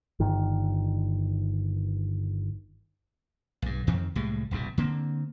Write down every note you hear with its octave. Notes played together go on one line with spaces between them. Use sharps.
G1 D#3
B1 G2
F2 D#3 F3 C4
C2 A2 G3 G#3
D#1 C2 G2 B2
D3 A#3 C4